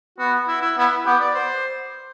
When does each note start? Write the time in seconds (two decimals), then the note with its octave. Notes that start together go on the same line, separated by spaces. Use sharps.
0.19 B3 F#4
0.48 E4
0.62 E4
0.77 B3 E4
1.06 B3 G4
1.20 D5
1.35 C5